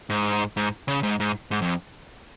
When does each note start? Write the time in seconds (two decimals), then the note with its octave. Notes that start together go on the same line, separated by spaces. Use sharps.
0.10 G#2
0.57 G#2
0.88 C#3
1.03 G#2
1.20 G#2
1.51 G#2
1.62 F2